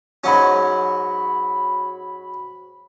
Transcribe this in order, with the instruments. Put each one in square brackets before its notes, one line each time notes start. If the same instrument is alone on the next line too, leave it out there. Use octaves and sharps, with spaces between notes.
[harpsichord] G#2 F#3 C#4 [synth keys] F#4 B5